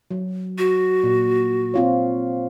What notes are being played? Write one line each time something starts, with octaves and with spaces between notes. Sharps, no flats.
F#3
F#4
A#2
C4 F4 C#5